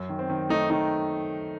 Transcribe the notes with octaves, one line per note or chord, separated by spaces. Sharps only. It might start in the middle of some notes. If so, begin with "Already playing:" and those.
Already playing: F#2
D#3
C4
D#3
A3 D#4
D#3 D#4